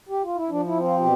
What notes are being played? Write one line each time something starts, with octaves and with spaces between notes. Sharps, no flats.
G4
F4
E4
F3 D4
E4
C4
F4
B2 G4